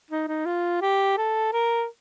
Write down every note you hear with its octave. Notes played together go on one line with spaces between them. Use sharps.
D#4
D#4
F4
G4
A4
A#4